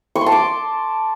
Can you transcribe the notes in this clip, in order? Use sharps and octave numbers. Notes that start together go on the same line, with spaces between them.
C#6
C6
A5
D6